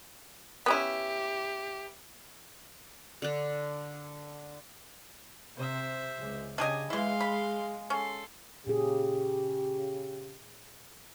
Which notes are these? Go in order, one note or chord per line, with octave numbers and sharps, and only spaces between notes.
B3 C#4 E4 G4
D3 D4
C3 C5 E5
C#2
C#3 D4 G4 D#5 G#5
E3 G#3 E4 F5 C6
B5
C#4 A4 C6
A#2 C#3 G4 G#4